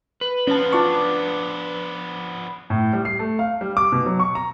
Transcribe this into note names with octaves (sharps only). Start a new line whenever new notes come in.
B4
F3 B3 C#4 A5
D4 F4 C#6
A2
G3
C7
A3
F5
G3
D6
B2
F#3
C#6
A#5